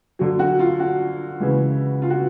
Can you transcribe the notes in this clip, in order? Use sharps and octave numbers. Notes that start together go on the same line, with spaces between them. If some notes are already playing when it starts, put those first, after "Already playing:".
D3 F#3
F#4
F4
F#4
C#3 E3 G#3
F4
F#4